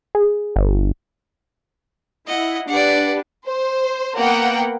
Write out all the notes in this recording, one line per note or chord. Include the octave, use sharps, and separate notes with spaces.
G#4
G1
E4 D#5 F#5
D4 G4 B4 D5 F#5
C5
A#3 B3 F#5 G5